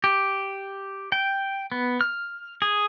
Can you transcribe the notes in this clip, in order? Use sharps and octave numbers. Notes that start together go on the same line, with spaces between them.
G4
G5
B3
F6
G#4